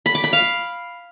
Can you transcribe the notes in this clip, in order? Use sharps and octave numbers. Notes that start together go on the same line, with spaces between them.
B5
D6
B5
F5